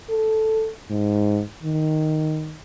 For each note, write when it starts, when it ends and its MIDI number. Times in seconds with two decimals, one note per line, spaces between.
0.10 0.70 69
0.90 1.42 44
1.63 2.58 51